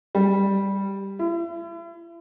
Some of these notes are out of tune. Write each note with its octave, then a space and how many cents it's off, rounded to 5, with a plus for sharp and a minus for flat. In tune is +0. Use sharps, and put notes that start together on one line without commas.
G3 +0
E4 +40